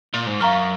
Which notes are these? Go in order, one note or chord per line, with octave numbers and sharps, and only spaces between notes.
A#2
G#2
F#2 F5 A#5 C#6 F6